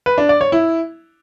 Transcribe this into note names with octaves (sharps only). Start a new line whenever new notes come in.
B4
D4
D5
C#5
E4